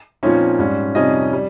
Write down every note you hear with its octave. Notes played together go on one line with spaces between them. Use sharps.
A#2 F3 C4 C#4 D#4 C#5
G#2 G3 C#4
F2 C3 G3 C#4 D#4 D#5
G3